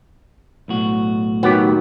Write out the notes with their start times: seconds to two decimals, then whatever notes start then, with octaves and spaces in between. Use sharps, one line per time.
0.68 B1 A2 F#4
1.43 D#3 F#3 B3 G4